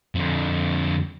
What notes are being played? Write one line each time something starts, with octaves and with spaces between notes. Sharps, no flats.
F2 D3